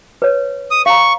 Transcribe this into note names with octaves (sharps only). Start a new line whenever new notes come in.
B4 C#5
D#6
F5 A#5 C#6